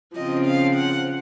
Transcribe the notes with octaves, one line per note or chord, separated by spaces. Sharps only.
C#3 F3 C4 D#5
F5
F#5